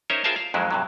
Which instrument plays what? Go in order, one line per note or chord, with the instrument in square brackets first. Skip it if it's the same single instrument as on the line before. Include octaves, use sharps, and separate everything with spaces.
[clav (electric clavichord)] C#4 D#4 A#4 C5 C#5 E5
F4 G#4 A#4 C5 E5 A5
F5
F2 D#3 F#3 G#3 E4
G2 C3 F#3